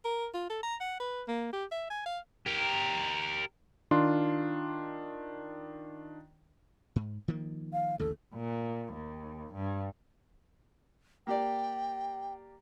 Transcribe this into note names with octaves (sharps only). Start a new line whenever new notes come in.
A#4
F4
A4
A#5
F#5
B4
A#3
G4
E5
G#5
F5
G4 A#4
D#3 D4 F4 C6
G#2
D#3 F3 A#3
F5
A1 D#2 D3 A4
A#2
D#2
G2
A#3 G4 D5 G5